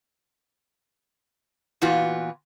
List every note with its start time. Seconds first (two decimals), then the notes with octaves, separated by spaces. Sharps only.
1.81 A#2 E3 B3 F4 F#4